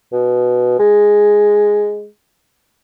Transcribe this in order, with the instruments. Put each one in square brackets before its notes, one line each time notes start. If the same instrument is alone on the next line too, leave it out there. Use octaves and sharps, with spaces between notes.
[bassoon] B2
G#3